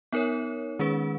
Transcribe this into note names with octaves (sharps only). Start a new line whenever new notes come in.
B3 D#4 A#4 C#5
D#3 G#3 C#4 G#4 B4